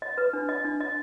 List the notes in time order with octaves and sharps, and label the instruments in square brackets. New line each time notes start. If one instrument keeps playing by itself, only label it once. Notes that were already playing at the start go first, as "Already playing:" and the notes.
[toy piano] D#5
B4
D4
D#5
D4
D#5